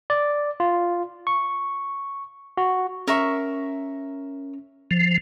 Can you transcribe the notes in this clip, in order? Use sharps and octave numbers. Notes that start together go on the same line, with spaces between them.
D5
F4
C#6
F#4
C#4 A#4 E5 C#6
F3